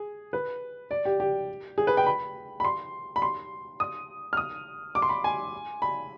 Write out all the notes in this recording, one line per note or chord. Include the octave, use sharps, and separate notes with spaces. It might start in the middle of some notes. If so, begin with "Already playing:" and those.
Already playing: G#4
B4
D5
G4
G4
G#4
B4
G5
B5
B5
C6
B5
C6
D#6
F6
D#6
D6
C6
B5
G#5
B5